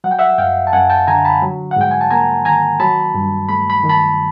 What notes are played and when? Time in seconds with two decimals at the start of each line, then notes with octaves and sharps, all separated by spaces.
0.04 F#3 F#5
0.11 G5
0.19 E5 F#5
0.38 F#2 F5 G5
0.67 A5
0.73 F#2 F#5 G#5
0.90 G5 A5
1.08 D3 G#5 A#5
1.25 A5 B5
1.42 F#3
1.71 F#5
1.76 G#2 G5
1.91 G#5
2.01 A5
2.11 A#3 G#5 A#5
2.45 D#3 G#5 A#5
2.80 F#3 A5 B5
3.14 G2
3.49 A3 B5
3.70 B5
3.83 D#3
3.89 A5 B5